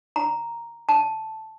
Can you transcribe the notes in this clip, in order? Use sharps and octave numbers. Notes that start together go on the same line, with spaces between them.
A#5
A5